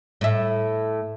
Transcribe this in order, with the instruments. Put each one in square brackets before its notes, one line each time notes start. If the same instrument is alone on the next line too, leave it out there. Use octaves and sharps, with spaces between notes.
[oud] A2 E5